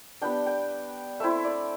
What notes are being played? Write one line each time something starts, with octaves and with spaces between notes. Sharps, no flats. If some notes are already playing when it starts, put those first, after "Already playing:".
G3 B3 D4 G5
G5
A3 C4 E4 E5
D5